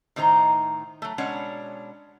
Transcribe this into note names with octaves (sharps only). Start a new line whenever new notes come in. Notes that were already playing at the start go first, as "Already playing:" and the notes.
A2 D#3 D#4 C5 A#5
F#3 A3
B2 G#3 C#4 D4 C#5 F#5